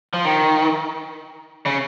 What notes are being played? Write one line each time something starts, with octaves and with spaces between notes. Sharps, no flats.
F3
D#3
C#3